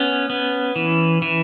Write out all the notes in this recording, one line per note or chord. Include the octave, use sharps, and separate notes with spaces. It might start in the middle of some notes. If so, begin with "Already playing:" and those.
Already playing: B3 C#4
B3
E3
E3